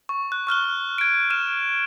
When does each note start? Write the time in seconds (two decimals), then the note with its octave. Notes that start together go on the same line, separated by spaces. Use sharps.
0.09 C#6
0.32 F#6
0.47 C#6 F6 F#6 G7
0.98 G#6 D7
1.30 F6 D#7 E7